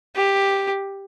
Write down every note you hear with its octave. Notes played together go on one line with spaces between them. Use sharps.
G4